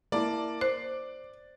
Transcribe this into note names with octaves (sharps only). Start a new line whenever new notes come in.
A#3 E4 D5 A5
C5 F#6